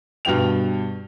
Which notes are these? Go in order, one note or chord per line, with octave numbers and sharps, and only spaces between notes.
G2 B2 G5 F7